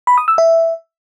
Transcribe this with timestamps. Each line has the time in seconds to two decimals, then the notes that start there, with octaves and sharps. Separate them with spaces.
0.07 B5
0.18 D#6
0.28 E6
0.38 E5